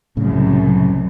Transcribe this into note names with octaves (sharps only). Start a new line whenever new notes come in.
C2 F#2 A2 C#3